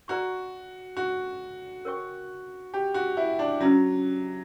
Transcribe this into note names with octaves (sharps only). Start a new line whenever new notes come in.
F#4 B4 D5 A#5 C#6
F#4
A#4 C#5 G5 C#6
G4
F#4
E4
D4
F#3 C#4 E4 B4